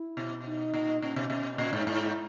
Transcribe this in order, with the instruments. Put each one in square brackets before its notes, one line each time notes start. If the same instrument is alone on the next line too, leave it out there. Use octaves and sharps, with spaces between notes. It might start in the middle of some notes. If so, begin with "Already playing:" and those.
Already playing: [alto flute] E4
[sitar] B2
[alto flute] D#4
[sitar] A#2
[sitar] A#2 [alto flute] C#4
[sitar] B2
B2
[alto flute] B3
[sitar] A#2 [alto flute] C#4
[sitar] G#2 [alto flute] D#4
[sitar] G#2 [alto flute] E4